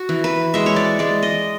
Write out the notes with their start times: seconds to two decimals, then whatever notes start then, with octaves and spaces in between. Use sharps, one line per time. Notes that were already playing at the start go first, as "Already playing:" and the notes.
Already playing: F#4
0.09 E3
0.24 B4
0.54 G#3 E5
0.66 C#5
0.76 D5
0.99 G#3 D5
1.23 D#5